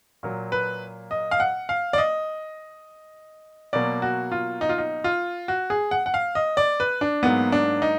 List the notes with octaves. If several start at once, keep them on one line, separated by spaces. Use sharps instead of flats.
A#2 F#3 A#3
B4
D#5
F5
F#5
F5
D5
D#5
B2 F#3 A#3 D5
F#4
F4
D#4
F4
D#4
F4
F#4
G#4
F#5
F#5
F5
D#5
D5
B4
D4
G#2 F#3 A#3 B3
D4
D#4